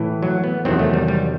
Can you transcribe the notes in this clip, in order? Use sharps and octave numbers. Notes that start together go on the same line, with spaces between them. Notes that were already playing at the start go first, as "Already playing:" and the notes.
Already playing: A2 E3
F#3
B3
E2 C3 D#3 F#3 C4
A3
G3
G3